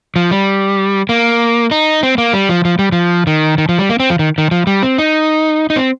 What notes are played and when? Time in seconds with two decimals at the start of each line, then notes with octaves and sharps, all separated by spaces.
0.16 F3
0.31 G3
1.09 A#3
1.71 D#4
2.03 C4
2.18 A#3
2.33 G3
2.49 F3
2.65 F3
2.79 G3
2.92 F3
3.27 D#3
3.58 D#3
3.69 F3
3.79 G3
3.89 A#3
4.00 C4
4.10 F3
4.19 D#3
4.38 D#3
4.51 F3
4.67 G3
4.83 C4
4.98 D#4
5.70 D#4
5.76 C4